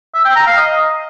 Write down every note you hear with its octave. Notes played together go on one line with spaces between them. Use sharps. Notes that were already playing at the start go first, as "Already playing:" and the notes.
E5
G5
A#5
F5
D#5